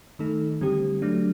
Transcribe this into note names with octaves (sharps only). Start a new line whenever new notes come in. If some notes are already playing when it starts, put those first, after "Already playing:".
D#3 A3 D#4 A4
D3 G3 C4 G4
F#3 A3 D4